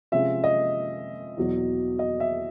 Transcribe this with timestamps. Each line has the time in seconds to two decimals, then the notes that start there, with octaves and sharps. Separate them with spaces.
0.12 C3 F3 G#3 C#4 F4 E5
0.44 D#5
1.37 E2 B2 F#3
1.99 D#5
2.20 E5